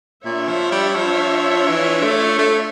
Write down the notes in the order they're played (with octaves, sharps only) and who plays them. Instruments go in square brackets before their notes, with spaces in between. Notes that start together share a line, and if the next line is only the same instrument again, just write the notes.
[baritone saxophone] A#2 [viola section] D4 F4 C#5 E5
[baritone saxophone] F3
G3
F3
E3
A3
A3